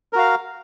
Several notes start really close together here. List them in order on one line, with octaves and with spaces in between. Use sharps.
A#4 F#4 F5